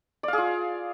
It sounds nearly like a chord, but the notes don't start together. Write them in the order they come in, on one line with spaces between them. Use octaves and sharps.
D5 F5 G#4 F4